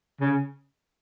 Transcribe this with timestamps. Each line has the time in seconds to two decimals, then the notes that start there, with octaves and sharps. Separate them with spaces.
0.21 C#3